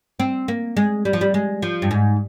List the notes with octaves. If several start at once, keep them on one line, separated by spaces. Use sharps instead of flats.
C4
A#3
G#3
G3
F3
G3
G#3
F3
G2
G#2